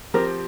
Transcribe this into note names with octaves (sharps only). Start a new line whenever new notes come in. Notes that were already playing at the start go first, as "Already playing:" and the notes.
F3 C4 G4 A#4